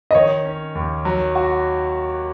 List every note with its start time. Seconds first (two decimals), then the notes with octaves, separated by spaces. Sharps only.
0.11 D#5
0.14 D#3 C#5
0.45 C#4
0.75 D#2
1.05 F#3
1.35 F#4